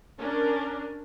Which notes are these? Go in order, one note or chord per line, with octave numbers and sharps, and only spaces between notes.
C#4 D4 A#4